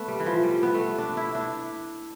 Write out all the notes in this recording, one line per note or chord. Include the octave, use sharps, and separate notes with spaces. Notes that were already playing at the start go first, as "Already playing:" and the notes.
Already playing: A3 B3
G3
E3
F3
G3
B3
A3
D4
E4
D4